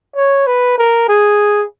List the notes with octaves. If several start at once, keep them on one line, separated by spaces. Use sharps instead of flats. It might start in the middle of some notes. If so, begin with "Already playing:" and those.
C#5
B4
A#4
G#4